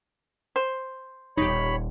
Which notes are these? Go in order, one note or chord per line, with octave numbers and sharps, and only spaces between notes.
C5
D#1 D#4 G4 C#5 B5